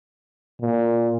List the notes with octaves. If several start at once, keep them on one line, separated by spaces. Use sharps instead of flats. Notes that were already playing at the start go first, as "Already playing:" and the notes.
A#2